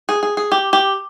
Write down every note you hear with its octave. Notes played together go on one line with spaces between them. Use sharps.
G#4
G#4
G#4
G4
G4